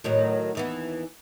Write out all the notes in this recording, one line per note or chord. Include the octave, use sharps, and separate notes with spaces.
A2 D#3 F#3
D#2 E3 B3